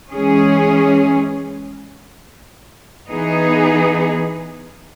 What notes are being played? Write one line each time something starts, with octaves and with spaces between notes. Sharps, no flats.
E3 G#3 C#4 G#4
E3 B3 D#4 G#4